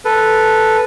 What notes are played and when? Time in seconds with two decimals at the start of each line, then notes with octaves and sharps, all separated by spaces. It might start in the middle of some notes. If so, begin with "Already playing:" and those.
0.05 A4 B4